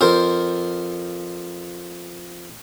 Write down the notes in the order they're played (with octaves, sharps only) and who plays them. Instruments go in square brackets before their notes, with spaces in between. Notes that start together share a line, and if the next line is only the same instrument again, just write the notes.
[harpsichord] F2 A#4 C5